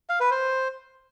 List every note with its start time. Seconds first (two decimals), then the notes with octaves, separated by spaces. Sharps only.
0.09 F5
0.20 B4
0.31 C5